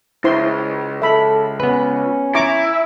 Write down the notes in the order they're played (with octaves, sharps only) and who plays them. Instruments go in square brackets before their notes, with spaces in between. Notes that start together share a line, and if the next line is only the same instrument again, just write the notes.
[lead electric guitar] C#2 [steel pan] E4 C5 C6
[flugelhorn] A4 [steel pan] E5 B5
[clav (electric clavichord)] B3 B4 [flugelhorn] C#4
[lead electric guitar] E4 [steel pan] A#5 C#6 D6